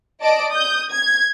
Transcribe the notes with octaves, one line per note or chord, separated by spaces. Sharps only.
D5 D#5 A5 D7
D#6 G6
G#6